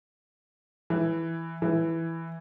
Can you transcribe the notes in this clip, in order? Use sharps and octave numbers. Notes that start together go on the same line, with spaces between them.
E3
E3